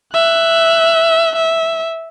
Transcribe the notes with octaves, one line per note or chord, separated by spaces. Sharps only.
E5 F#6
E5